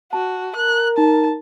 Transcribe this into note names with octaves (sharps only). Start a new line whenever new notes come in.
F#4 A5
A#4 F#6
D#4 A5